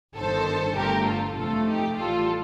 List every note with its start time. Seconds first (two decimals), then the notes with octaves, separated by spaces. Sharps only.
0.17 G1 G2 D#3 A4 C5
0.76 G1 G2 D3 A3 G4 A#4
1.06 F4 A4
1.36 F2 C3 F3 A3 F4 A4
1.65 D#4 G4
1.96 A1 A2 G3 F4 A4